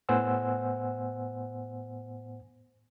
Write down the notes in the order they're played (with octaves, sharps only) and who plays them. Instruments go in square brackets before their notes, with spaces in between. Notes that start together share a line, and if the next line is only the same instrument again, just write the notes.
[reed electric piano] A2 B3 C5 F#5 G#5 E6